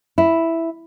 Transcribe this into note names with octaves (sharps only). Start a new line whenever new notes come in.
E4